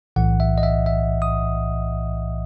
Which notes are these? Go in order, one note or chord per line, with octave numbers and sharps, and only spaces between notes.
B1 A2 E3 F#5
E5
D#5
E5
E5
D#6